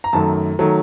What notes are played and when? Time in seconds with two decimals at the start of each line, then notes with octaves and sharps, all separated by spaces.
0.04 A#5
0.13 F#2 D#3 F#3 A3 A5
0.59 D#3 F#3 A3